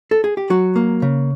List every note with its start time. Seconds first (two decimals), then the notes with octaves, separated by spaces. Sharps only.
0.11 A4
0.24 G#4
0.37 G4
0.50 F#3 F#4
0.76 A#3
1.02 C#3